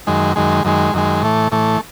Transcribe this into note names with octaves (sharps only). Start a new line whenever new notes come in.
F#2 D#3 G#3
F#2 D#3 G#3
F#2 D#3 G#3
F#2 D#3 G#3
A2 E3 A3
A2 E3 A3